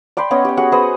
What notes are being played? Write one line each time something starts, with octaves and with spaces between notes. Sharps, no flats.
D5 G5 B5 C6
B3 C#4 C#5 D#5
G4 G5
F#4 G#4 F#5 G#5
G#4 B4 C5 D#5